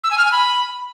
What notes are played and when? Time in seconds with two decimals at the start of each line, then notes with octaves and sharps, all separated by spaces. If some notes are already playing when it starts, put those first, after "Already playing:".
0.04 E6
0.11 G#5
0.18 F6
0.25 G#5
0.32 B5